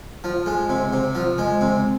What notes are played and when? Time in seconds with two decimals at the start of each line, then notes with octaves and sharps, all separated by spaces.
0.24 F3
0.46 G#3
0.69 C3
0.93 C3
1.15 F3
1.38 G#3
1.61 C3